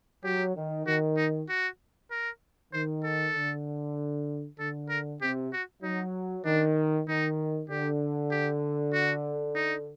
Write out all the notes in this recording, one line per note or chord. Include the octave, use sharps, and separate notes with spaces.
F#3 G4
D#3
D#3 F#4
D#4
F#4
A#4
D#3 C5
A4
D3
D3 A4
A#4
C3 G4
F#4
F#3 D#4
D#3 D4
D#3 D#4
D3 G4
G4
F#4
D#4